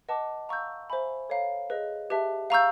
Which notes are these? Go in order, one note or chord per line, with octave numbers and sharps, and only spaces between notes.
B4 D#5 F#5 A5 D6
F5 A#5 C#6 E6 G6
C5 E5 G#5 B5
A4 C#5 F5 A#5
G#4 B4 D#5
G4 B4 E5 A5
F5 A#5 C#6 E6 G6